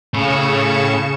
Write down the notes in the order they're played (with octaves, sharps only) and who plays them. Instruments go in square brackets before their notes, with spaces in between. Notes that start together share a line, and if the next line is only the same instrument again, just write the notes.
[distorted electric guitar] A2 [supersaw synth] C#3 C#7 E7